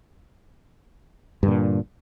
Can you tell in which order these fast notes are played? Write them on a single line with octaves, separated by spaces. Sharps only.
G2 D3 A#2